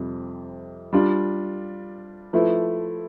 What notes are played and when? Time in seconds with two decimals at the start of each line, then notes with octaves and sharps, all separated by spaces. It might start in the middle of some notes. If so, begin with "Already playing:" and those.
Already playing: F2 C3 G3
0.93 G3 D4 F4
2.33 F3 A3 E4 B4